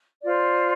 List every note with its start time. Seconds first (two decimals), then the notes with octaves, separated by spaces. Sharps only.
0.23 F4 C5 D5